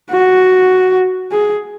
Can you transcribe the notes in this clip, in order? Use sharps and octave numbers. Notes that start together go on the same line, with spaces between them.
F#4
G#4